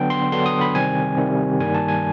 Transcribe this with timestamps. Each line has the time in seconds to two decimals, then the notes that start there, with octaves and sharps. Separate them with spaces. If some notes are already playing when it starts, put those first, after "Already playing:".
Already playing: D3 F#3 B3 D4 G5
0.10 C6
0.32 D3 F#3 B3 D4 C6
0.46 D#6
0.61 B5
0.75 C3 D#3 G3 C4 G#5
1.17 C3 D#3 G3 C4
1.60 G2 D#3 G3 A#3 G#5
1.75 A5
1.88 G#5